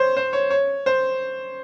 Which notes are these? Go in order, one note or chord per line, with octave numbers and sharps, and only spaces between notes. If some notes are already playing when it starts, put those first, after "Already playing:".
Already playing: C5 C#5
C5
C#5
C#5
C5